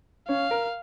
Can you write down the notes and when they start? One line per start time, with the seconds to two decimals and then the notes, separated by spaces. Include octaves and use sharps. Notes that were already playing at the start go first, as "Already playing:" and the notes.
0.28 C#4 C#5 F5
0.51 A#4